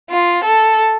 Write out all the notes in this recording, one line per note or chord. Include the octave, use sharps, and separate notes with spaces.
F4
A4